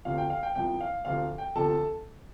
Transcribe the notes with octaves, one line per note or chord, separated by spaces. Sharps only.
D2 C3 F3 F5
G5
F5
G5
C2 C3 F3 G5
F5
D2 C3 F3 F5
G5
D2 C3 F3 A4 A5